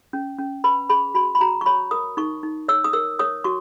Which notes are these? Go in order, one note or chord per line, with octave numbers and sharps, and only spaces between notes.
C#4
C#4
B4 B5
G#4 B5
F#4 B5
B5
F#4 A#5
C#6
C#5 B5
A#4 D#6
D#4 C#6
D#4
C#5 E6
D#6
A#4 E6
C#5 D#6
F#4 C#6